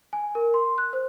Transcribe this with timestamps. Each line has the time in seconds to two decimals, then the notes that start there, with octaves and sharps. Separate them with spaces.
0.13 G#5
0.35 A#4
0.54 C6
0.78 F#6
0.93 C5